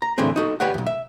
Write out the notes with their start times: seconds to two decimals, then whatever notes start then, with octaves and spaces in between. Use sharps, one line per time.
0.02 A#5
0.18 A2 D3 E3 A3 C4 G#4
0.36 D#4 F#4 A4
0.60 G4 B4 C#5 D5 F#5
0.74 B1 E2
0.86 E5